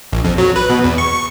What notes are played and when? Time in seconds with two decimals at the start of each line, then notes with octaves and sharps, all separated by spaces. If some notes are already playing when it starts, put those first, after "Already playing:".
0.13 A#1
0.24 F2
0.38 F#3
0.56 B4
0.70 B2
0.84 E2
0.98 C#6
1.14 C#6